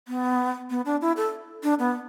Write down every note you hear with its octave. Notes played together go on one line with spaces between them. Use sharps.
B3
B3
D4
E4
A4
D4
B3